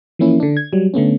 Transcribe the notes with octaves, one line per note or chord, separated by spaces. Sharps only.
E3 F3 A#3 C#4 E4
D3 D4
G#6
F#3 G3
D3 A3 B3 C#4